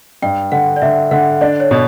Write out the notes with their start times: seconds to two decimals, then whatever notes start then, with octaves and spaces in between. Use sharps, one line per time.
0.22 G2 G5
0.52 D3 F#5
0.76 D5
0.82 D3 E5
1.11 D3 F#5
1.41 D4 D5
1.60 C#5
1.71 B2